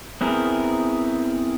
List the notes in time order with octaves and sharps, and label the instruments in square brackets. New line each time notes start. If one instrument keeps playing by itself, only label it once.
[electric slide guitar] B3 C4 E4 G#4 A#4